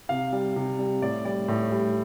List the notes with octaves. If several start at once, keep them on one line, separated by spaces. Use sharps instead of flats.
C3 F5
G3
C3
G3
A2 D5
G3 D5
A2
G3